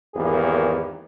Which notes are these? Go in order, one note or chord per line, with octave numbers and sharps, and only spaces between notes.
G#1 E2 A#3 G4 G#4